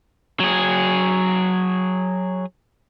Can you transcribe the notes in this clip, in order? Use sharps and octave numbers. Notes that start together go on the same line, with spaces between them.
F#3 G#4